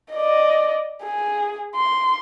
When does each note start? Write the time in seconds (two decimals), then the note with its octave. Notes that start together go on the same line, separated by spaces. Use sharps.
0.12 D5 D#5
1.03 G#4
1.76 C6